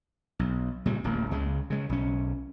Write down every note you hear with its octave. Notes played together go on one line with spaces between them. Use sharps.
B1
A#2 C#3 G3
D1 A1 A#3
C#2 C#3 G#3
C#3 G#3
B1 C#4